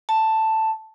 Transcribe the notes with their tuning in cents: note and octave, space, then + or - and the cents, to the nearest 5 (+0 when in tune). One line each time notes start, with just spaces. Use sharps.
A5 +5